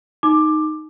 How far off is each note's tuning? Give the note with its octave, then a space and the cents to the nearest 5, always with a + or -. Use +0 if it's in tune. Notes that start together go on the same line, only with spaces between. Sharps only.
D#4 +0 D6 +15